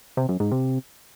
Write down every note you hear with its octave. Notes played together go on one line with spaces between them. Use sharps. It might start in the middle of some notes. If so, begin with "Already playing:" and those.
C3
F#2
G#2
C3